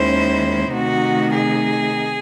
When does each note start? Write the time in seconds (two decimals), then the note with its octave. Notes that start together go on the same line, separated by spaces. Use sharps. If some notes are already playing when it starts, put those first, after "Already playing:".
Already playing: D#2 D#3 G#3 C#4 E4 C5
0.73 C3 D#3 A3 D#4 F#4
1.35 G#4